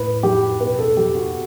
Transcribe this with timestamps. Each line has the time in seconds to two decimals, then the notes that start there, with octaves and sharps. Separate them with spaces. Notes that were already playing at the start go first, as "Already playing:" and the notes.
Already playing: A2 B4
0.23 F#3 G4
0.60 B2 B4
0.79 A4
0.97 F#3 G4
1.15 F#4